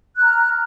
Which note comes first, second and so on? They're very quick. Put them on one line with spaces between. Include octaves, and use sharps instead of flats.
F#6 F6 A#5